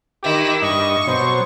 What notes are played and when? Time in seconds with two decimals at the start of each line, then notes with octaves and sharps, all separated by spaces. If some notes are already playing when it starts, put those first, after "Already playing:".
0.23 D#3 E4 G4
0.62 G2 D#5 C#6
1.07 B2 F#3 C5